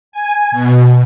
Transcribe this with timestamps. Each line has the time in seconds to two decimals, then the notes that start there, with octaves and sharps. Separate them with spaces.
0.12 G#5
0.51 B2